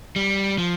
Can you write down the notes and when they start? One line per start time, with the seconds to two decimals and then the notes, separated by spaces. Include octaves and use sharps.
0.16 G3
0.58 F3